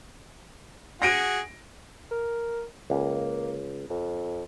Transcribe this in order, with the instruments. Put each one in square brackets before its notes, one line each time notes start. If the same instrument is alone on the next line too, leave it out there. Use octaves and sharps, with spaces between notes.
[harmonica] F#4 G#4 [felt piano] A#6 D7 D#7
[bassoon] A#4
[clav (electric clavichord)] C#2 [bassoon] A#3
[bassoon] F2